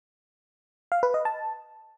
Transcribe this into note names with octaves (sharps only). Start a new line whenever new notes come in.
F5
B4
D#5
A5